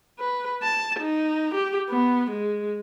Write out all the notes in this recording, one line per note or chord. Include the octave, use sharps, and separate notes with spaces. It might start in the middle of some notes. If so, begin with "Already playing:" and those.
B4
A5
D#4
G4
B3
G#3